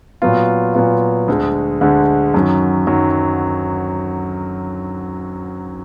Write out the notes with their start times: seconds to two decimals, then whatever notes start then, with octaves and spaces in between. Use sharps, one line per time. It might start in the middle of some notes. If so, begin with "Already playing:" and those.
0.22 A#2 F#3 B3 F4
0.74 A#2 F#3 B3 F4
1.28 D2 D3 G#3
1.81 D2 D3 G#3
2.34 F#2 D#3 F#3
2.87 F#2 D#3 F#3